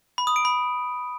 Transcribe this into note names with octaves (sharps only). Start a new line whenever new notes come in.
B5
D#6
D7
B5